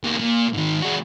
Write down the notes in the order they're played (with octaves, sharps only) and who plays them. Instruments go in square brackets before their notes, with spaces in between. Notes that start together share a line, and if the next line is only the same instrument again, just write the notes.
[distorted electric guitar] E2 A#3
A#2
G#2 D#3
G#3 F#4